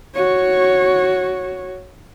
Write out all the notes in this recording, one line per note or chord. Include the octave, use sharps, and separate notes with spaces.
F#4 C#5